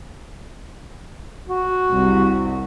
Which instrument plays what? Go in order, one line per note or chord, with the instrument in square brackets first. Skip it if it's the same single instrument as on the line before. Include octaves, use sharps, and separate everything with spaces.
[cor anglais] F#4
[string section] C2